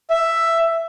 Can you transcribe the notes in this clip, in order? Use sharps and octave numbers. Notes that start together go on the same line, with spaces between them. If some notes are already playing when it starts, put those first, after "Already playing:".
E5